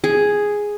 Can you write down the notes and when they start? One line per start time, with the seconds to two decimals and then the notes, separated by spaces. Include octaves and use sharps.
0.04 G#4